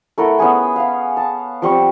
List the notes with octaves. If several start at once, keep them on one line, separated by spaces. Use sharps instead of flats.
A3 E4 A#4 F#5
B3 C#4 G#4 G#5
F5 F#5
A5
F3 G3 C4 C#6